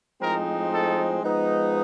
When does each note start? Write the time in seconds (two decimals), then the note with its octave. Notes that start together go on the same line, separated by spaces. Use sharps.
0.21 A2 F3 G#3 C4 D#4 A#4
0.72 A4
1.22 F3 G#3 B3 D#4